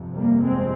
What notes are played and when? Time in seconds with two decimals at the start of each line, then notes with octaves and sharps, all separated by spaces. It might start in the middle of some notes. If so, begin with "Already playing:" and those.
Already playing: G1 F2 C3
0.15 G3 A#3
0.43 G#3 C4